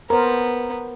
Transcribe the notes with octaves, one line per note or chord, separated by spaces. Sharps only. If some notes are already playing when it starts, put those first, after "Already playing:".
B3 A#4 C5